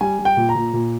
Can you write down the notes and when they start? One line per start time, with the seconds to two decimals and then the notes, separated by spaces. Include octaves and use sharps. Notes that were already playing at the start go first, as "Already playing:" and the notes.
0.01 G3 G#5
0.19 G3
0.25 G5
0.37 A#2
0.49 A#5
0.55 A#2
0.73 A#2